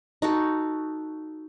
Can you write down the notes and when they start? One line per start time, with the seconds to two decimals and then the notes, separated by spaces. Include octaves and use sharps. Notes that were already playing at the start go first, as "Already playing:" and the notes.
0.22 D#4 F#4 A4